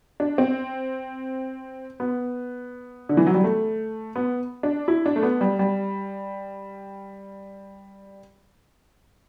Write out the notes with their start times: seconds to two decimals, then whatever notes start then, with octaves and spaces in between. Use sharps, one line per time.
0.20 D4
0.38 C4
2.00 B3
3.09 D3
3.17 E3
3.26 F#3
3.34 G3
3.44 A3
4.16 B3
4.63 D4
4.88 E4
5.06 D4
5.16 A3
5.23 B3
5.41 G3
5.59 G3